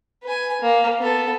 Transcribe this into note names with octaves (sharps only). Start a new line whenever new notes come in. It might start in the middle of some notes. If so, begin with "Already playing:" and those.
B4 G#5
A#3
B3 A4